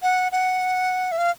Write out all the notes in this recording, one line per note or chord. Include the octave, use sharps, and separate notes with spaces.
F#5
F#5
E5
F5